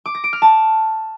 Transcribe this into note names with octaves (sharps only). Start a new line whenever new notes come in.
D6
A#6
D7
F6
A5